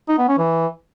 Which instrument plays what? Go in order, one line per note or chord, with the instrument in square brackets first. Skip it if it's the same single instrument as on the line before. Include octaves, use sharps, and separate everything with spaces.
[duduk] D#4
B3
C#4
E3